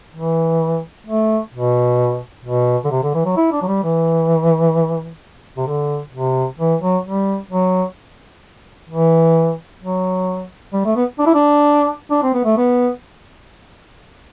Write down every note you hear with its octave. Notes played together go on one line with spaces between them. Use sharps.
E3
A3
B2
B2
D3
C3
D3
E3
F#3
E4
D4
F#3
G3
E3
C3
D3
C3
E3
F#3
G3
F#3
E3
F#3
G3
A3
B3
D4
E4
D4
D4
C4
B3
A3
B3